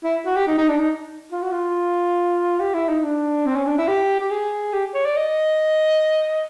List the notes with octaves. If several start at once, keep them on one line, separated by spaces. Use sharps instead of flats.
E4
F#4
G4
D#4
D#4
D4
D#4
F4
F#4
F4
G4
E4
D#4
D4
C4
C#4
D4
E4
G4
G4
G#4
G4
C#5
D5
D#5